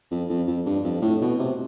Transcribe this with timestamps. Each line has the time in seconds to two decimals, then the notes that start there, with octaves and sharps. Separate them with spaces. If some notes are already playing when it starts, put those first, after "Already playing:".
0.11 F2
0.29 F2
0.47 F2
0.66 G2
0.84 F2
1.02 A2
1.21 B2
1.39 C3